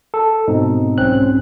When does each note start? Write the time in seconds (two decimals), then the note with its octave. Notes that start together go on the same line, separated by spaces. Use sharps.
0.14 A4
0.47 G#2 B2 C4 D#4
0.98 B1 G#2 C4 C#4 F#6